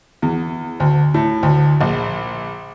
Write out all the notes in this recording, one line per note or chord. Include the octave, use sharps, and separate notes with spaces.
E2
D2
A2
D2
A#1